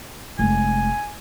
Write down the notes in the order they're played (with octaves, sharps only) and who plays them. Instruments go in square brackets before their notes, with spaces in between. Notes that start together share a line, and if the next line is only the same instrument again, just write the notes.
[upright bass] F1 G#3 [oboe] G#5